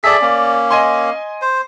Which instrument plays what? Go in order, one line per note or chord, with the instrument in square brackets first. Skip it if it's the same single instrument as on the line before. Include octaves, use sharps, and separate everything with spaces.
[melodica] G#4 A4 E5 [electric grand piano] D5 B6
[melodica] A#3 C#4
[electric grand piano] D#5 G#5 C6
[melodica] C5